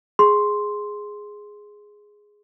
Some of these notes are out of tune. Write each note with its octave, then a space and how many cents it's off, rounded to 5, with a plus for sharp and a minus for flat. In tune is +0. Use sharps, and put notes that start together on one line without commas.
G#4 +0 C6 +0